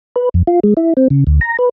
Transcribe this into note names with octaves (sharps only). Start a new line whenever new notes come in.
B4
F2
F4
G#3
E4
C4
C#3
D2
A#5
B4